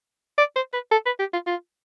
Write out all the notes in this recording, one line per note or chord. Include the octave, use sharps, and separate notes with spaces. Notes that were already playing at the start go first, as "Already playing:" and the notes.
D5
C5
B4
A4
B4
G4
F4
F4